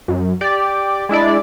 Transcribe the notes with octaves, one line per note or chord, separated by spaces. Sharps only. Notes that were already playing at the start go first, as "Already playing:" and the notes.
F#2
G4 D5
G#3 D4 E4 D5